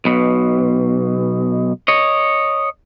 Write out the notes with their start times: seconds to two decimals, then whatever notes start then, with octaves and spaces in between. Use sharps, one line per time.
0.05 B1 B2
1.88 C#5 D#5